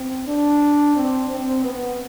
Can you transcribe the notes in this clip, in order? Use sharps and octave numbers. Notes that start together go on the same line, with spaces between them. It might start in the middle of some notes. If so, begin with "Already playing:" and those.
Already playing: C4
D4
C4
C4
B3